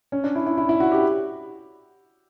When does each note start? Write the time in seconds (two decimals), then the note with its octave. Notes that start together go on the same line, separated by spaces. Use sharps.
0.12 C#4
0.24 D4
0.35 E4
0.46 E4
0.58 E4
0.69 E4
0.80 F#4
0.92 G4